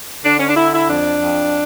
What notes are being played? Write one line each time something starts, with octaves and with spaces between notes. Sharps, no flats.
D3 D4
C#4
D4
D3 E4
E4
F2 D4
F2